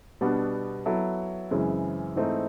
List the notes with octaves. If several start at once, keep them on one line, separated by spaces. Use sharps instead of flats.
B2 G3 B3 D4 F#4
F#3 B3 E4 A4
F#2 C#3 E3 G#3 C4
G#2 E3 A3 C4 D#4